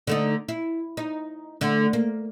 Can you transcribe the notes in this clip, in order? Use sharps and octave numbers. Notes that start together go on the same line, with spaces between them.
D3 A3 D#4
E4
D#4
D3 A3
A#3